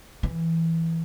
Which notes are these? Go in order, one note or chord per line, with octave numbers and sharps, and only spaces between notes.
E3